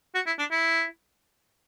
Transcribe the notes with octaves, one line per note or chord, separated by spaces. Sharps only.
F#4
E4
D4
E4